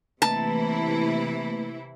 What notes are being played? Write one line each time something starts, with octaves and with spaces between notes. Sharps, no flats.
C3 E3 A3 A#3 E4 B4 A5